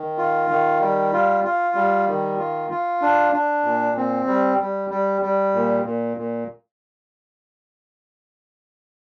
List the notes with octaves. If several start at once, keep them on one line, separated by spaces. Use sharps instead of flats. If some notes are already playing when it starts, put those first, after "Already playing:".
Already playing: D#3
F4
D#3
G3
F4
F4
G3
D#3
F4
F4
D4
D4
A#2
C4
G3
G3
G3
G3
A#2
A#2
A#2